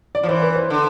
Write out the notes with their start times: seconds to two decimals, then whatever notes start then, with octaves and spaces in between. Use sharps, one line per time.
0.15 D5
0.23 F3
0.28 E3 C5
0.42 B4
0.56 C5
0.70 D3